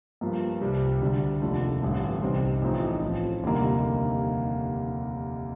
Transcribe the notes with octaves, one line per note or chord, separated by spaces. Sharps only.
G2 F3 A#3
C2 C3 G3
D2 D3 G3 D4
F1 D#2 D3 F3 A3
A1 G2 D3 A3
C2 C3 G3 C4 D#4
A1 A2 F3 C4 D#4
A2 F3 C4
F1 D#2 D3 G3 A#3